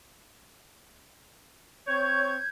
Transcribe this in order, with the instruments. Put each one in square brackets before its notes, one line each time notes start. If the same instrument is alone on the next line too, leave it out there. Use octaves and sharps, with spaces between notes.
[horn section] C4 C#5 [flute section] G6 G#6